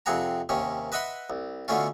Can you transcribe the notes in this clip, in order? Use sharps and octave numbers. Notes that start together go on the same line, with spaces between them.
F2 C3 C4 G#4 F#5 A#5
D#2 C3 D#3 C#4
B4 D#5 E5 F#5 B5 C6
C2
B2 D3 A3 C#4 F4